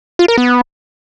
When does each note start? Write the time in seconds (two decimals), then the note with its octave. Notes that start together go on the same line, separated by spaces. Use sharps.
0.19 F4
0.28 A#4
0.38 B3